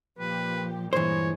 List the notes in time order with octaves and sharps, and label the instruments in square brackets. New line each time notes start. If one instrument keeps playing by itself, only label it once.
[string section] A#2 F3 G4 [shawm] B4
[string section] G2 A#2 G#3 [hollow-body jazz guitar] E3 C5 [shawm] C#5